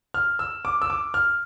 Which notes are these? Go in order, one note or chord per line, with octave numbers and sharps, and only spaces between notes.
F6
E6
D6
E6
D6
F6